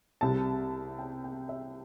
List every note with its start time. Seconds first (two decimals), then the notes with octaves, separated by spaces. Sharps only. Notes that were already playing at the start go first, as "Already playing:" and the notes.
0.21 C2 C3 G3 A5
0.99 G5
1.24 G5
1.49 E5